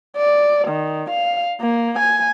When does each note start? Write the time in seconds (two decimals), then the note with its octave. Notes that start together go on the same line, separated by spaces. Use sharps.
0.17 D5
0.68 D#3
1.10 F5
1.61 A#3
1.99 G#5